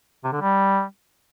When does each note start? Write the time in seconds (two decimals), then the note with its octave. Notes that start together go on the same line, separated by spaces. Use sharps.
0.24 C3
0.32 D3
0.41 G3